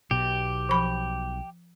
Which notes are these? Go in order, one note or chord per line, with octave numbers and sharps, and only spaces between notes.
B1 B2 G4
F3 B5